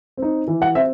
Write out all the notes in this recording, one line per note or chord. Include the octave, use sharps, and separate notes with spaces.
C4 D#4
E3
F#5
C4 E5